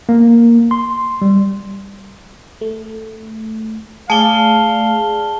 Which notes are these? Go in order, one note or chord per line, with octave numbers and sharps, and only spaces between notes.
A#3
C6
G3
A3
A3 G#4 D5 F5 A5 G7